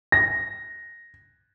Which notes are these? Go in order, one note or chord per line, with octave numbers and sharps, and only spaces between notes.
A#6